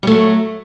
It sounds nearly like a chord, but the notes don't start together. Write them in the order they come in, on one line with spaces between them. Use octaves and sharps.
G3 A3 F#3